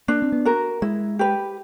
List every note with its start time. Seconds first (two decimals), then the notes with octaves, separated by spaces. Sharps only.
0.08 A#3 D4
0.22 C4
0.32 B3
0.45 F#4 A#4
0.82 G#3 E4
1.19 G4 B4